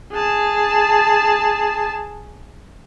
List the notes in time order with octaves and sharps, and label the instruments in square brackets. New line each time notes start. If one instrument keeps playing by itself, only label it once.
[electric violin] G#4 A5